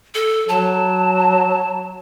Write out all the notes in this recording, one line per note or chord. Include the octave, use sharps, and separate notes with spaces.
A4
F#3 A5